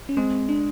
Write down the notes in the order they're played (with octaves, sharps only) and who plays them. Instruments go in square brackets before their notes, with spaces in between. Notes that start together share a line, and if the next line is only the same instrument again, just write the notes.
[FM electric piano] C#4
[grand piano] G#3 [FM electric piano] C4
[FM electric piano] D4